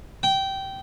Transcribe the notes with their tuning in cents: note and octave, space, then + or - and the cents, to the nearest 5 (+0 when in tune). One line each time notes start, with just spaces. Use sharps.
G5 -15